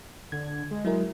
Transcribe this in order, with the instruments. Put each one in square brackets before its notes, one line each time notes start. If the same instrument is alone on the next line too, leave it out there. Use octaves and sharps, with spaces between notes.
[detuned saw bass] D3 [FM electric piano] G#6
[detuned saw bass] G#3
[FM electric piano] F#3 E4 A#4